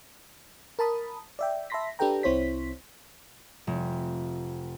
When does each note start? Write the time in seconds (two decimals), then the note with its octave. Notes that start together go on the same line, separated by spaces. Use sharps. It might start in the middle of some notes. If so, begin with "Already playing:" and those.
0.79 A#4 A5 B5 D#6
1.39 D5 E5 G5
1.70 E5 A5 B5 C6 A#6 B6
1.99 D4 G4 A4 B4 G5 A#5
2.23 C2 C4 E4 C5 C#5 B6
3.67 F1